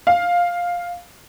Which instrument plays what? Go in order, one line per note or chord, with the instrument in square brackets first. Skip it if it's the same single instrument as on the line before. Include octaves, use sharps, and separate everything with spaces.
[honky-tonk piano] F5